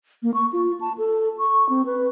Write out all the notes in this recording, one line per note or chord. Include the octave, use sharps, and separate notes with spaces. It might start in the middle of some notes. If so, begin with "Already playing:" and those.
A#3
C#6
F4
A5
A4
C#6
C4
B4